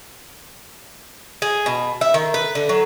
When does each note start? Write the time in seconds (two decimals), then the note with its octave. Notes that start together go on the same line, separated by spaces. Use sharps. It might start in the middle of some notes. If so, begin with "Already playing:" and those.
1.42 G#4
1.66 B2
2.01 E5
2.14 D#3
2.34 B4
2.55 D3
2.69 F#3